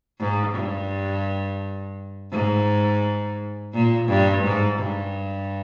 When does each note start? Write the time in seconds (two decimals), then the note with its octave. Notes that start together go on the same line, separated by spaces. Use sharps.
0.19 G#2
0.54 G2
2.31 G#2
3.74 A#2
4.09 G2
4.44 G#2
4.79 G2